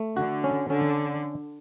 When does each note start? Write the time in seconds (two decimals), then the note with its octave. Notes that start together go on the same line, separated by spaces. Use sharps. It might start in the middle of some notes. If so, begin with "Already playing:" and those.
Already playing: A3
0.17 D3 F#4
0.44 C#4
0.70 D3 C#4